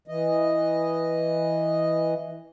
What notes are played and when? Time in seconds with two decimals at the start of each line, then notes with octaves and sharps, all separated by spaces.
0.08 E3 D#5